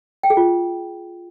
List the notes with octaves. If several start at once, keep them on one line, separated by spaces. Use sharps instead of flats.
G5
G#4
F4